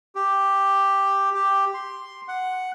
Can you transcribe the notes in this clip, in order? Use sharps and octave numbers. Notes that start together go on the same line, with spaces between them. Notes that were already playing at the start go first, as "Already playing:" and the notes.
G4
G4
C6
F#5